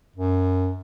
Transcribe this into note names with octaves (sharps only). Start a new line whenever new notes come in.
F#2